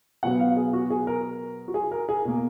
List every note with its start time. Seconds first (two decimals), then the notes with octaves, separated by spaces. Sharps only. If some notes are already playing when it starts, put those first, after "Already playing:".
0.23 B2 F#3 B3 F#5
0.40 F5
0.57 G#4
0.73 F#4
0.90 G#4
1.07 A#4
1.68 F#4
1.74 G#4
1.91 A#4
2.09 G#4
2.25 B2 A#3